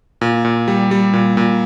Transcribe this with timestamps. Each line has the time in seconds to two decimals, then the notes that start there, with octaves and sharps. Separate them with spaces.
0.21 A#2
0.45 A#2
0.68 G3
0.91 G3
1.13 A#2
1.37 A#2